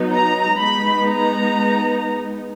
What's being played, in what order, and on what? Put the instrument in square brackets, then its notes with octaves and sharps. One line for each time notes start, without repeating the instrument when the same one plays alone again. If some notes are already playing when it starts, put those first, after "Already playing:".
Already playing: [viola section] F#3 B3 D#4
A#5
G#3 B3 D#4 B5
A#5